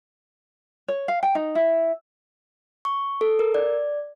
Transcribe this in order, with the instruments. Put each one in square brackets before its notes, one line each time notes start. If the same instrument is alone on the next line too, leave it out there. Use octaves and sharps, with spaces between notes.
[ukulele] C#5
F5
G5
D#4
E4
[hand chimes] C#6
A4
A#4
D5